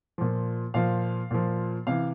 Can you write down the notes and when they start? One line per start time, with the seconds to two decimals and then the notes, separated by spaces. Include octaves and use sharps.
0.18 A#2 F3
0.74 A#2 F3 F5
1.31 A#2 F3
1.87 C3 E3 F5